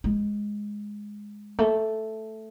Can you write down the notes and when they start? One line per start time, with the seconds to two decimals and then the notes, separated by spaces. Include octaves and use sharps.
0.04 G#3
1.59 A3